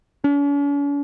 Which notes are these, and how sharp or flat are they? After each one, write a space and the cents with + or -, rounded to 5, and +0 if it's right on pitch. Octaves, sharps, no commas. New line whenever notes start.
C#4 +45